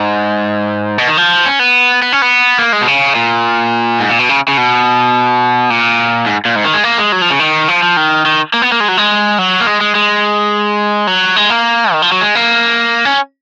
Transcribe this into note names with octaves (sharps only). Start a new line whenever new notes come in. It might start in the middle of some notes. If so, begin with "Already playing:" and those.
Already playing: G#2
B2
D#3
F3
C#4
B3
B3
C#4
B3
A#3
G#3
B2
C#3
A#2
G#2
A#2
B2
C#3
C#3
B2
A#2
G#2
A#2
G#2
D#3
G#3
A#3
G#3
F#3
F3
C#3
D#3
F3
F3
D#3
D#3
A#3
B3
A#3
G#3
F#3
G#3
F#3
A#3
G#3
G#3
G#3
F#3
G#3
A#3
D#3
F3
F#3
G#3
A#3
C#4